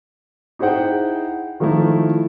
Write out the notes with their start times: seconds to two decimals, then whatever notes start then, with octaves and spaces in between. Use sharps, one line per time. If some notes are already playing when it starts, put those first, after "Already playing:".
0.59 D#4 E4 G#4 C5 F#5 G5
1.60 D#3 F3 A3 D#4 E4